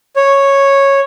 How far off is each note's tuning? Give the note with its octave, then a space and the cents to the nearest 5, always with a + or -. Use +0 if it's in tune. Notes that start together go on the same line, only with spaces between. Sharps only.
C#5 -5